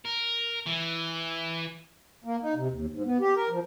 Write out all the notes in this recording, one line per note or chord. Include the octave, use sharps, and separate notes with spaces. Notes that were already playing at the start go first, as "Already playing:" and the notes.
A#4
E3
A#3
D#4
C3
D#2
G#2
B3
G4
A#4
F3